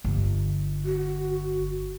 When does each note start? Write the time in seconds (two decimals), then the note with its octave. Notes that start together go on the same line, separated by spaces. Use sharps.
0.04 G1
0.85 F#4